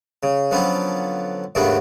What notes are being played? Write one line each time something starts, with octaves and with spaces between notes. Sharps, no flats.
C#3
D3 F3 F#3 B3 C#4
D#2 G#2 C#3 A3 B3 D4